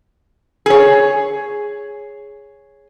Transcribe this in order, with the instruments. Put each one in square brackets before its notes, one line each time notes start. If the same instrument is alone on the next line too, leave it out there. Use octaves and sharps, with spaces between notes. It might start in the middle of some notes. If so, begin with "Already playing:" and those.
[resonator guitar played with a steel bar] G#4 C#5